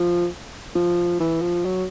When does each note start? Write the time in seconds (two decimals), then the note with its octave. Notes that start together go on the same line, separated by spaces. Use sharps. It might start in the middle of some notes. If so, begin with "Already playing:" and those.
Already playing: F3
0.75 F3
1.20 E3
1.42 F3
1.65 F#3